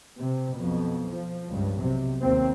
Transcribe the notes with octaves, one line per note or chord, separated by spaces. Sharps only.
C3
B1 F2 B2
F3
C#2 G2
B1 C3
D#2 C4